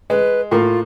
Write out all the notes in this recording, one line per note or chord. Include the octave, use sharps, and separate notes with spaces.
G#3 B4
A2 A#3 F4